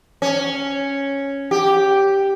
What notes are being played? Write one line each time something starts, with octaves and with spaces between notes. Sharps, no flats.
C#4
G4